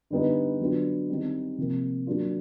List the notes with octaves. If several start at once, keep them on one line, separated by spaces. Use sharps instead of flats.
D3 G3 B3 D#4
D3 F#3 B3 D4 F4
D#3 G3 C4 D#4
C3 F3 A#3
F#3 A#3 D4 F4